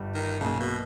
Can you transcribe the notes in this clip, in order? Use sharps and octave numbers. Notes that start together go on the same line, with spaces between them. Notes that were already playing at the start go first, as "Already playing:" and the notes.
Already playing: G1 G2 G3
D#3
B1 A#2 C#3 A#3
B2